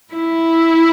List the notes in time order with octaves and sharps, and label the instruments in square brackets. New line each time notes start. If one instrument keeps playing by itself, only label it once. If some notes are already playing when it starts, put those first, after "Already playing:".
[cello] E4